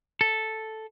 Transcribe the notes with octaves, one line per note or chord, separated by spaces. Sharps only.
A4